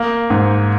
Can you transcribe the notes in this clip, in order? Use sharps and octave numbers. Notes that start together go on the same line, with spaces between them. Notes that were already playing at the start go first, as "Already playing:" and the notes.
Already playing: A#3
G#2